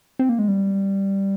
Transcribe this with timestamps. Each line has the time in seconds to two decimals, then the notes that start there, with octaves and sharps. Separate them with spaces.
0.19 C4
0.29 A#3
0.39 G#3
0.48 G3